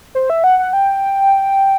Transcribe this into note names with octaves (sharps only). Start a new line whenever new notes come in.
C5
E5
F#5
F#5
G5